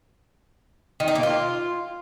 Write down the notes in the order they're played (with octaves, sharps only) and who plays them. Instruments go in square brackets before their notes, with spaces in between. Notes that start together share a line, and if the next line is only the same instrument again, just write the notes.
[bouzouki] D#3
D#4
A#3
F4